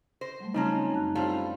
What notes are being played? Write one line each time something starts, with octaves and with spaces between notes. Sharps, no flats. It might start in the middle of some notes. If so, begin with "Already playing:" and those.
C5 A#6
F#3 G3 A3
C#3 F3 C4 C#4 D#4 A#5
F#2 A5 F#6
A2 G3 C#4 F4 C5 C#5